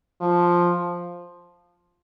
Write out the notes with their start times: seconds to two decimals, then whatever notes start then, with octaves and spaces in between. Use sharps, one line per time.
0.21 F3